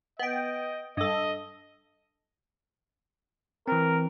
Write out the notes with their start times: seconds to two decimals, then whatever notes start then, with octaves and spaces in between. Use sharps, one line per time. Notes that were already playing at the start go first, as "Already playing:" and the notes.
0.19 B3 D#5 G5
0.97 G2 A4 D#5
3.68 E3 C4 A#4